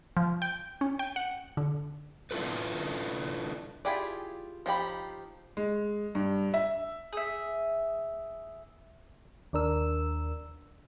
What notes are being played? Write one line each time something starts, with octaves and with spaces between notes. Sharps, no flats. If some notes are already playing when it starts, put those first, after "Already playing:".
F3
G5
C#4
G5
F#5
D3
D4 E4 F4 A4 B4
E4 F4 G4 G#4 D5
F3 D#4 G4 B5
G#3
G2
E5
G#4 E5
D#2 D4 A#4 E6